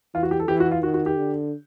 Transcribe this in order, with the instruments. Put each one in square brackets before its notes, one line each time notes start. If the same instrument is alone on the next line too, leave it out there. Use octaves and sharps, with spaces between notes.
[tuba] E3 [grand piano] F4
[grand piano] F#4
G4
A4
[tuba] E3 [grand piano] G4
[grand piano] F#4
F4
[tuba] D#3 [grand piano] F#4
[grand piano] F#4
G4
[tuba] D3